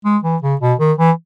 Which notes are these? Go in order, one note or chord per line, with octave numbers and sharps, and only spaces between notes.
G#3
E3
C#3
B2
D#3
E3